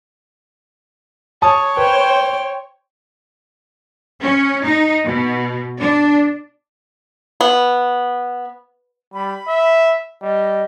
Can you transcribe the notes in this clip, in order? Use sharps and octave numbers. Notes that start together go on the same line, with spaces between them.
C#5 A5 D#6
B4 C5 G5
C#4
D#4
B2
D4
B3
G3 B5
E5
G3 D#5